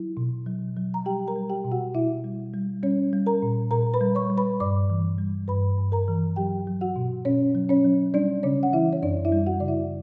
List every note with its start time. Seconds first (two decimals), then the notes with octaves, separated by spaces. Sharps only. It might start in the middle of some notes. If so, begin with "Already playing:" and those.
Already playing: F#3 E4
0.17 B2
0.47 F#3
0.76 F#3
0.94 A#5
1.05 G3 G4 G5
1.28 A#4 A#5
1.36 G3
1.49 G4 G5
1.64 B2
1.72 F#4 F#5
1.94 B2 E4 E5
2.24 G3
2.54 G3
2.83 G3 C#4 C#5
3.13 G3
3.26 A#4 A#5
3.42 A#2
3.71 A#2 A#4 A#5
3.94 B4 B5
4.01 G3
4.15 C#5 C#6
4.30 G3
4.37 B4 B5
4.60 G2 D5 D6
4.90 E3
5.18 G3
5.48 G2 B4 B5
5.78 G2
5.92 A#4 A#5
6.08 E3
6.36 F#3 G4 G5
6.67 F#3
6.81 F#4 F#5
6.96 B2
7.25 B2 C#4 C#5
7.55 F#3
7.69 C#4 C#5
7.84 F#3
8.14 G3 D4 D5
8.43 C#3 C#4 C#5
8.63 F#5
8.73 E3 E4 E5
8.93 C#5
9.03 F#2 D4 D5
9.25 E4 E5
9.32 G3
9.47 F#4 F#5
9.60 C#3 D5
9.68 E4 E5